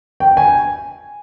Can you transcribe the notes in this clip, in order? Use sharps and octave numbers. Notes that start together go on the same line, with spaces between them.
G5
G#5